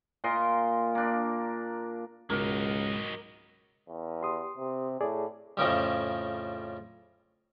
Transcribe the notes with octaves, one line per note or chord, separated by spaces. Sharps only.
A#2 A#4 D#5 C6
A#3 D4
C#2 G#2 B2 F#3 D#4 A#4 D6
E2
G4 C6 D#6
C3
A2 G#4 D5
F2 A2 C#3 G3